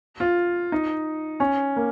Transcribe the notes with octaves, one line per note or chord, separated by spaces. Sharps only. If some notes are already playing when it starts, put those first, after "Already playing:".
F4
D#4
C#4
A#3